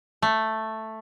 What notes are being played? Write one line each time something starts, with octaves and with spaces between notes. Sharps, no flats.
A3